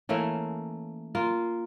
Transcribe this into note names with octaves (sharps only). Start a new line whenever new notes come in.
E3 A3 A#3 C#4
A#3 F4